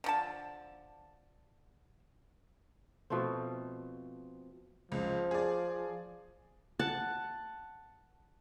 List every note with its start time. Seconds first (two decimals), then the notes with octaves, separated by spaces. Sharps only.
0.04 D3 F3 A5
3.10 B2 F3 A3 C4
4.92 C#2 F3
5.31 G#4 D5
6.79 F#5 A5